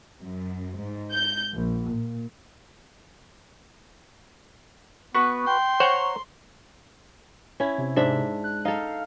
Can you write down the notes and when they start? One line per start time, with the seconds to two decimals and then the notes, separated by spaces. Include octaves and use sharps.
0.20 F#2
0.77 G#2
1.12 G6
1.54 A#1
1.90 A#2
5.14 B3 F#4 B4 C#6
5.47 G5 C6
5.80 C5 C#5 F#5 A#5 C#6
7.60 C#4 E4
7.78 C3
7.96 G#2 D4 E5
8.44 F#6
8.65 D#4 A4 F5